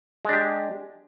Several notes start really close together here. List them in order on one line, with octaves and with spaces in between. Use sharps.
G#3 D4 G4